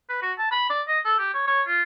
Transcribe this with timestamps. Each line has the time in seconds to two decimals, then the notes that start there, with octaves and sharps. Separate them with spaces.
0.09 B4
0.22 F#4
0.38 A5
0.51 B5
0.70 D5
0.88 D#5
1.05 A4
1.19 G4
1.34 C#5
1.47 C#5
1.67 F4